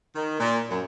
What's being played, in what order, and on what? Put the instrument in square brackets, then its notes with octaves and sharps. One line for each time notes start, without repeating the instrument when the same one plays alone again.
[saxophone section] D#3
A#2
F#2